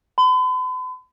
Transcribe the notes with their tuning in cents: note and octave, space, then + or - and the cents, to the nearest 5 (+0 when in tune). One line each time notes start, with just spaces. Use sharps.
B5 +45